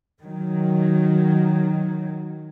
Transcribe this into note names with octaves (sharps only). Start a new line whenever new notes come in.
D#3 F#3